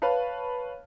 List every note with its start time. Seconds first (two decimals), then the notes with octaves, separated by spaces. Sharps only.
0.02 B4 C#5 F5 A5